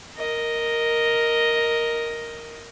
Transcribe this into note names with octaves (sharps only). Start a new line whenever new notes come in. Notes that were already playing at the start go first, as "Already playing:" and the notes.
A#4 D#5